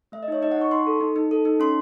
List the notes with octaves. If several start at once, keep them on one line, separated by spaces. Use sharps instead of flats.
A3 E5
D#5
D#4 C#5
D#4 D#5
F#5
D#4 C#6
D#4 C6
A4
D#4
D#4
A4
D#4
C#4 C6